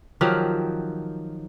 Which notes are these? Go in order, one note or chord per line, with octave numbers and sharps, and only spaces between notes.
D#3 F3 F#3 G4